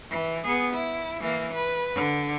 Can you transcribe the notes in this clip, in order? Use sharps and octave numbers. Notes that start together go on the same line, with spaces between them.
E3
B3 G#4
E4
E3 A#3
B4
D3